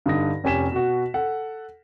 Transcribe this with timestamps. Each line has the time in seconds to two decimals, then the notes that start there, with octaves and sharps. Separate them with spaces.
0.06 G2 D3 D#4 D#6 A#6
0.44 F1 C#4 G4 G#5 B6 E7
0.72 B2 F#4
1.14 A4 F#5